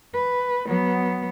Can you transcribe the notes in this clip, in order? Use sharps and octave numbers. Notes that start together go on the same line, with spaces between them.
B4
F#3 B3